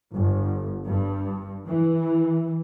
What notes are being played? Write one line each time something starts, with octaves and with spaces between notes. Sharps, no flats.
G1
G2
E3